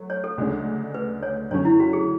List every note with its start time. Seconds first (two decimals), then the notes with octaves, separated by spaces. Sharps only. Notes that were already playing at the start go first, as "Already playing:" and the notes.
Already playing: F#3 A3
0.10 C#5
0.24 A4
0.38 D2 C#3 G#3 D4
0.94 B4
1.23 C#5
1.50 F#2 D3 F#3 C#4 C#5
1.65 E4
1.80 F#4
1.93 G#4